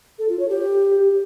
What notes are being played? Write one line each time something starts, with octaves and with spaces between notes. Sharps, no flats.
A4
F4
C#5
G4